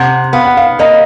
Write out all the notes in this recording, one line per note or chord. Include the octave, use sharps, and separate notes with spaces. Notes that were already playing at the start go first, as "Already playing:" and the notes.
Already playing: C3 F#5
B3 F5
F#5
F5
A#3 D#5